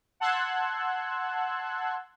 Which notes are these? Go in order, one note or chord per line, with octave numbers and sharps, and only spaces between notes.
F#5 A5 C6 E6 F#6 G#6